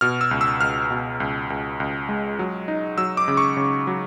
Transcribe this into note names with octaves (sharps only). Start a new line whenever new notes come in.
B2 F6
E6
C#2
E6
C#2 F6
B2
C#2
C#2
C#2
G#3
F#3
D#4
F#3 E6
D6
C#3
C#6
C#3
F#3